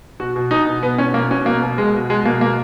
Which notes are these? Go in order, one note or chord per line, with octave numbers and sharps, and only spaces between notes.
B2 F#4
B2
B2 D#4
B2
B2 B3
B2 C#4
B2 A#3
B2 C#4
B2 A#3
B2
B2 G#3
B2
B2 G#3
B2 A#3
B2 A#3